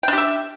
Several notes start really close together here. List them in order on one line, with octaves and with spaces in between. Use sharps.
G5 D4 G4 E5